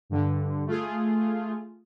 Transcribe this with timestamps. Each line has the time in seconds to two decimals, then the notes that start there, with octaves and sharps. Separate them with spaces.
0.10 G2 D3
0.66 A3 F4 G#4